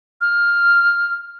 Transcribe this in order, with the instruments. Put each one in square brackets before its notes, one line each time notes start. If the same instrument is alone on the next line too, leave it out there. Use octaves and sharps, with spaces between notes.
[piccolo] F6